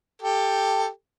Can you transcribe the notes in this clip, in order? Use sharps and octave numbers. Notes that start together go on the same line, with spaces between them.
G4 A4